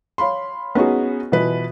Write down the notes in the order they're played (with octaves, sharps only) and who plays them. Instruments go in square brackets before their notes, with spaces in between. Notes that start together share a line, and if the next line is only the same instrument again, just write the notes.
[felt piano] C#5 F5 B5 C6
B3 C#4 D#4 F#4 G#4
B2 E3 F4 B4